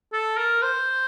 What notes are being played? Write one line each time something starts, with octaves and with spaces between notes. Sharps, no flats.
A4
A#4
C5